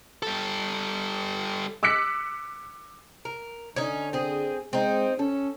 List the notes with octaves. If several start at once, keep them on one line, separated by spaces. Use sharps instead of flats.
G3 A4
D6 E6 F#6 B6 C#7
A#4
D3 C#4 D#4
C4 G#4
G#3 C4 D#4
C#4 A4